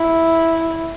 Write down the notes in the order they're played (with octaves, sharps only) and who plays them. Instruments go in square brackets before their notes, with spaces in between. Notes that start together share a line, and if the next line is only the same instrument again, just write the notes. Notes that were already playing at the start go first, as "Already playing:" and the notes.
Already playing: [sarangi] E4